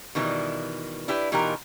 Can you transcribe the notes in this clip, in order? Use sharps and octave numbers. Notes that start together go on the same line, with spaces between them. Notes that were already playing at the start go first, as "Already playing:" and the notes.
B2 D#3 E3 G3
D4 E4 G4 B4
B2 E3 D#4 F4 G4 A#4